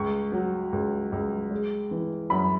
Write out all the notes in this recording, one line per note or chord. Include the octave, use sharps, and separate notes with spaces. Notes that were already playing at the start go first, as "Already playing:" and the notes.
Already playing: C#2 C#6
F#3
C#2
C#2
G#3
E3
F#2 B5